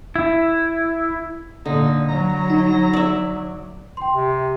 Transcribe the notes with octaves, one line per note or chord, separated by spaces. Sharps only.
E4
A#2 D3 D#4
F#3 A#5
D#4
D5 E5
G5 C6
C3